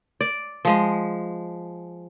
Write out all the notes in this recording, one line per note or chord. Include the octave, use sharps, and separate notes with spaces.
D5
F3 G#3